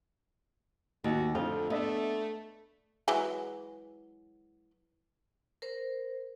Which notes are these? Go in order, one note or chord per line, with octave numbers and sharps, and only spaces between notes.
D#2 F#4
F2 D3 A3 C4 F4
A3 B3 D4 D#5 E5
E3 F#3 G#3
A#4 C5